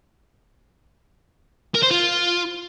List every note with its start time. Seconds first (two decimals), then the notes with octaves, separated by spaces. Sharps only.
1.74 A#4
1.83 C5
1.91 F4